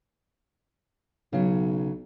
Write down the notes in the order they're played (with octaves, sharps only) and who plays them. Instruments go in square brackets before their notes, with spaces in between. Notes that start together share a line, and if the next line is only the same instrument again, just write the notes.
[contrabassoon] B1 [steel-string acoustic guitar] C#3 F#3